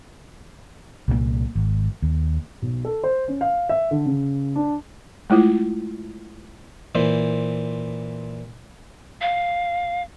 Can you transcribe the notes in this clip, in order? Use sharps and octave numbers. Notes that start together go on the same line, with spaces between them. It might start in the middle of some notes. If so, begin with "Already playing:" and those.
C2 A#2 F3 A#3
G#1
D#2
B1
A4
C5
C#4
F5
E5
D3
C#3
D4
G#3 A3 E4 F4
A#2 E3 C5
F5